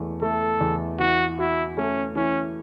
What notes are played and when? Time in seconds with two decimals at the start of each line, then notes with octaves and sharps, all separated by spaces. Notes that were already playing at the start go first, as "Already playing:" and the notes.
Already playing: E2 A3
0.22 A3 A4
0.61 E2
0.99 E3 F#4
1.38 E4 F#4
1.77 A3 C#4
2.16 E3 C#4